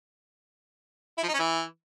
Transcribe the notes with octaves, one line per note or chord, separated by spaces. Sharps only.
E4
F3
D#4
C#4
E3